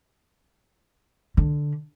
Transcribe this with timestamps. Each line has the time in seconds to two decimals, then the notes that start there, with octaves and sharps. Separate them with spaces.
1.37 D3